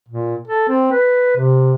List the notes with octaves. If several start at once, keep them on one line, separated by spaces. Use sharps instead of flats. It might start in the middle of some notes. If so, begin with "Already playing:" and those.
A#2
A4
C4
B4
C3